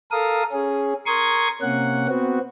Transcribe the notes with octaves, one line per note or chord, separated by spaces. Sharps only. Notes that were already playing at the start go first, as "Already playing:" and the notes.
A4 A#4 F5 D#6
C#4 G#4
A#4 C6 C#6 D#6 G#6
C3 A#3 C#4 F#5
B3 C4 F#4